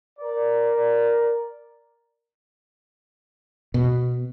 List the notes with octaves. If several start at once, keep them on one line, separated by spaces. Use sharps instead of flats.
A#4 D5
B2